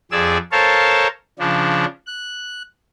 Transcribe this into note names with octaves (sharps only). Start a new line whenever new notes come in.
F2 G#4 D5 E6
A4 A#4 C5 C#5 F5 A5
C#3 F3 D4
F#6